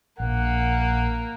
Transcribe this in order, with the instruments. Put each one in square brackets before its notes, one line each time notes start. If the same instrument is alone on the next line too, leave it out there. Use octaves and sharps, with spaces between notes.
[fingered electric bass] A#1 [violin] A#3 [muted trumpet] F#5